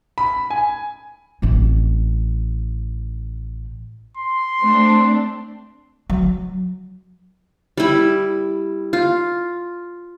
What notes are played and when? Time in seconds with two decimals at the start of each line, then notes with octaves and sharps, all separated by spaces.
0.18 B5
0.50 G#5
1.42 A1 C4
4.17 C6
4.60 A3 C4 D4
6.10 F#3
7.77 G3 E4
8.93 F4